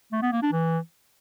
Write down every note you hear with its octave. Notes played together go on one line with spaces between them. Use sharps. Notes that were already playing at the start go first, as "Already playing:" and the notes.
A3
B3
A#3
D4
E3